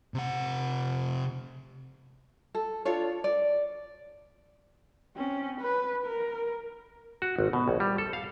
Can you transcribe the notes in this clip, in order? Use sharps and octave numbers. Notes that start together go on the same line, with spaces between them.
C3 F#5
A4
D4 F4 A4 C#5
D5
C4 C#4
B4
A#4
F#4
G#1
B2
A#1
G3
A4
F5